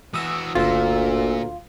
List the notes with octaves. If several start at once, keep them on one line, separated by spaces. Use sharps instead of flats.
E3 F#4 D#6 E6
G1 D2 A#2 D3 F4 E6